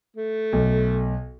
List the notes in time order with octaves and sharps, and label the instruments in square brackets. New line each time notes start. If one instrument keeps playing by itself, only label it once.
[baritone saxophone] A3
[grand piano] B1